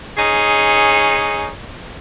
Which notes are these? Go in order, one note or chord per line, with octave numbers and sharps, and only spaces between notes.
C#4 D#4 G#4